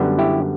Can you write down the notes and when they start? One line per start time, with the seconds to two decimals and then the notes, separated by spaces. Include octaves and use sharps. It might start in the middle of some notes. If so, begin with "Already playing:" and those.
Already playing: F#2 D3 G3 B3
0.19 E4 G4